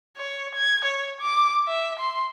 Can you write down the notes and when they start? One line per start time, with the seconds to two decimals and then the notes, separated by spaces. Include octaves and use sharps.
0.18 C#5
0.55 G#6
0.85 C#5
1.21 D6
1.68 E5
2.00 C6